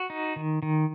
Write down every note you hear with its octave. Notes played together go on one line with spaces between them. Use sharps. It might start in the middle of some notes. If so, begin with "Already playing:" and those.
Already playing: F#4
D#4
D#3
D#3